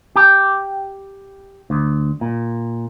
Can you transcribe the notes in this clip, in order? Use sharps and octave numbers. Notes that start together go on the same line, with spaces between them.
G4
D2
A#2